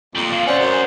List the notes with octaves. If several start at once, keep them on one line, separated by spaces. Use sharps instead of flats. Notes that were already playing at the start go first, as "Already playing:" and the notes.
F2 G3 A#3
A#3 C4 F5
C4 C#4 C5 D5 F#5
F#2
G#5